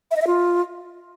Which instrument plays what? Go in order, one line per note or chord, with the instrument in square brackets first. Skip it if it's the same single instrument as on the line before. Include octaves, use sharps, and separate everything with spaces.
[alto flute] E5
D#5
E5
F4